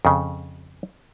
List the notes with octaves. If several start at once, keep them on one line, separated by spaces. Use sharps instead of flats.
F2 C#3